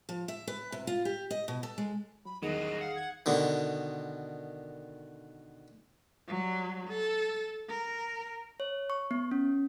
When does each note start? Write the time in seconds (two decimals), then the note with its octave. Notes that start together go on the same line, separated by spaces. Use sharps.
0.09 F3
0.28 E5
0.47 B4
0.72 C3
0.87 F4
1.05 G4
1.31 D#5
1.48 B2
1.63 A4
1.78 G#3
2.25 F#3 B5
2.42 E2 G2 D#3 F#3 G#4 D#5
2.81 F5 F#5
2.96 G#6
3.26 B2 D3 D#3
6.28 F#3 G3
6.88 A4
7.69 A#4
8.60 C#5
8.90 C#6
9.11 B3
9.31 C#4